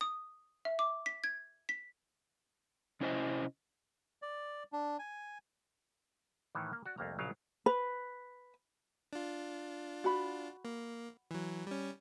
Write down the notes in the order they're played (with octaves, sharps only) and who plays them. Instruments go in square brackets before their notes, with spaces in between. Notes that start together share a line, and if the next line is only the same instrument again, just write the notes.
[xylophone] D#6
E5
D6
B6
G#6
B6
[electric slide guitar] C3 C#4 E4 C5 D#5 G#5
[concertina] D5
D4
G#5
[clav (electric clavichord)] A2 D#3 E3
A#3
F#4 D5
C2 F2 A3 A#3 A#5
A#1 C#3 F#3 F5
[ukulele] B4
[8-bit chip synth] D4 F4
[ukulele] F#4 B5
[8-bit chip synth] A#3
E3 F#3
G3 C#4